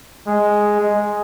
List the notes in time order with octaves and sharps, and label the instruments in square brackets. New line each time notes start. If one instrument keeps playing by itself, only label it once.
[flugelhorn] G#3
G#3